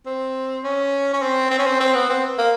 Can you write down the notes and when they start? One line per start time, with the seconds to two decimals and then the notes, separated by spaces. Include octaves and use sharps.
0.06 C4
0.64 C#4
1.13 C#4
1.22 C4
1.51 C4
1.59 C#4
1.67 C4
1.81 C4
1.95 B3
2.10 C4
2.38 A#3